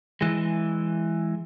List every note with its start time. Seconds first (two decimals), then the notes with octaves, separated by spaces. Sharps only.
0.21 E3 G#3